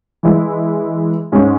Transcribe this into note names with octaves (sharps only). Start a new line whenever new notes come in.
E3 G#3 E4
G#2 G#3 C#4